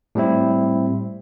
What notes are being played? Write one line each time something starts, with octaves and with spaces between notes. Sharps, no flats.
A2 G3 C4 E4